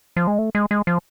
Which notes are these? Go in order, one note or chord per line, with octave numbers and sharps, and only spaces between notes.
F3
G#3
A3
G#3
G#3
F3